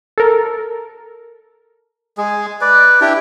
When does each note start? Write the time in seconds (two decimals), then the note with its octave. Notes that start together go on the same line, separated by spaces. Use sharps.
0.18 A4 A#4
2.18 G#3 G#4
2.61 B4 D5
3.01 D4 E4 G4 G5